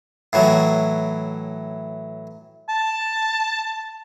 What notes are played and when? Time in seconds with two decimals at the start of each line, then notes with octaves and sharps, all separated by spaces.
0.33 A2 E3 F#3
2.69 A5